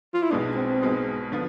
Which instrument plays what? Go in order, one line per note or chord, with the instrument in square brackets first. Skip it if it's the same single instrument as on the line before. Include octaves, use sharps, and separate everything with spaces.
[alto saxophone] F4
E4
[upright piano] B1 B2 G#3 B3 [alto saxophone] D4
[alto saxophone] C4
[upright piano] B1 B2 G#3 B3
D3 F3 B3 F4